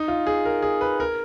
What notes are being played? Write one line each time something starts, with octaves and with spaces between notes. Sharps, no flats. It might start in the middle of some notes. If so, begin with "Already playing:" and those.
Already playing: D#4
F4
G#4
A#4
G#4
B4
A#4